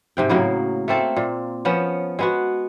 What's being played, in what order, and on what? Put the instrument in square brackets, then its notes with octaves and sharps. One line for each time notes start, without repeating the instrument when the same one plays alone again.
[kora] G#2 C3 G5
A2 C#3 F#3 A#3
A3 A#3 C4 A4
A#2
F3 B3 C#4
G#3 B3 F#4